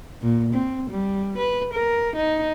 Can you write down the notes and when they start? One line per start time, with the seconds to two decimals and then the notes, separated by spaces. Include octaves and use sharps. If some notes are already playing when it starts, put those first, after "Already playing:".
0.22 A#2
0.54 C4
0.90 G3
1.38 B4
1.74 A#4
2.16 D#4